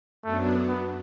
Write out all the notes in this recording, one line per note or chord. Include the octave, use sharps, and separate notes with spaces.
F#2 F#3 A3 B3 D4
B3